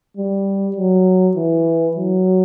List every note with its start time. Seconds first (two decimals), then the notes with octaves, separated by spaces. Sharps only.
0.17 G3
0.76 F#3
1.36 E3
1.97 F#3